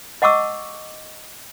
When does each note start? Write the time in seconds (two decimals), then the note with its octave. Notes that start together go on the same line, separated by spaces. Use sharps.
0.22 D#5 F#5 A5 C#6 D6 E6